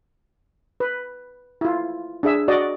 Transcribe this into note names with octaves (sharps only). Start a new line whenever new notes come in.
B4
E4 F4
D4 G#4 E5
F#4 D5 D#5